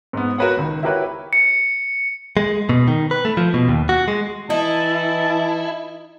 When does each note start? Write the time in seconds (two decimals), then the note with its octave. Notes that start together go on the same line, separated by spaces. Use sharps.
0.13 G#2 B3
0.38 F#4 A#4 B4 C#5 F#5
0.57 C#2 D#3
0.83 E4 F#4 G4 A#4 B4 C#5
1.33 C#7
2.37 G#3
2.69 B2
2.88 D#3
3.11 B4
3.25 A3
3.37 F3
3.54 B2
3.68 D#2
3.89 F#4
4.08 G#3
4.50 E3 D#4 E4 A5